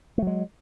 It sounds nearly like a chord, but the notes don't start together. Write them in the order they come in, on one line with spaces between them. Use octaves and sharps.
A3 F#3 G#3